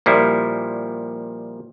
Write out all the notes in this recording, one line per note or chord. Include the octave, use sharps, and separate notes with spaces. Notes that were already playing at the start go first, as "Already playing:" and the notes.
A#2 F3 G3 E4